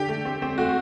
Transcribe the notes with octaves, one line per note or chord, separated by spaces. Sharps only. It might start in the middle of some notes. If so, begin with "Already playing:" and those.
Already playing: D3 G4
A3
C4
C4
A3 F#4